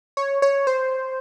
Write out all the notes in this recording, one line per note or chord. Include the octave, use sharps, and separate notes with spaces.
C#5
C#5
C5